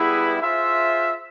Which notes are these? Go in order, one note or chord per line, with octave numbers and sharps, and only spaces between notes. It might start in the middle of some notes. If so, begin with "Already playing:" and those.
Already playing: G3 B3 E4 G#4 B4
F4 G#4 C5 E5